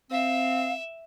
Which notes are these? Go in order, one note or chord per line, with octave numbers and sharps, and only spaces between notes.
C4 E5 F5